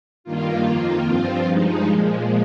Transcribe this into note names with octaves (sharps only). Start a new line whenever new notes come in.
G2 D#3 A#3 F4
F2 D#3 A#3 F4
G2 F3 C4 F4
G2 F3 G#3 D#4
A#2 F3 G#3